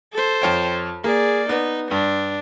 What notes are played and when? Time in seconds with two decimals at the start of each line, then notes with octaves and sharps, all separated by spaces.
0.13 A4 C5
0.42 F2 C#5 G5
1.04 A#3 G#4 D5
1.49 B3 D#4
1.91 G2 D4